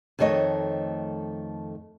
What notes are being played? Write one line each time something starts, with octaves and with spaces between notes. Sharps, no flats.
F2 D#3 A3 C#5 D#5